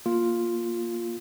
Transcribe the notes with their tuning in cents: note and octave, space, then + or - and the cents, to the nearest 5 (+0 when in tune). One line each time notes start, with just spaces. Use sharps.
A#3 +0 F4 +0